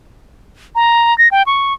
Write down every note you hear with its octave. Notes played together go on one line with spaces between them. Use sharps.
A#5
A#6
G5
C#6